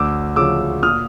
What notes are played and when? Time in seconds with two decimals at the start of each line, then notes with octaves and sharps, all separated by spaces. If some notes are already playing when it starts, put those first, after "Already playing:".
Already playing: D2 D6 E6
0.36 C#3 F3 D6 E6
0.83 A#2 D#6 F6